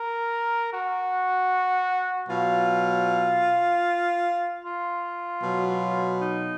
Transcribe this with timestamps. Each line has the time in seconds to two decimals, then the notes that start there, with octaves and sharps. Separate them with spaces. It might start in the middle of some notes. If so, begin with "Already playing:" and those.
Already playing: A#4
0.71 F#4
2.28 B2 F#3 F4
4.64 F4
5.41 B2 F#3
6.20 D#4